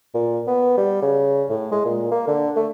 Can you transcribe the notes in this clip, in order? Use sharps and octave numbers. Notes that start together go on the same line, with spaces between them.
A#2
B3
G3
C#3
A2
G#3
A#2
A#3
D3
A3